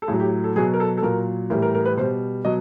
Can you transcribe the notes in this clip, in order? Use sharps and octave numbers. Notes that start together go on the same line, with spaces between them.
A4
A2 F#3 G#4
G4
A4
B2 F#3 G#4
A#4
A4
A4
A#2 F#3 A#4
A2 E3 G3 A#4
A#4
A#4
B4
B2 G3 C5
B2 F#3 D#5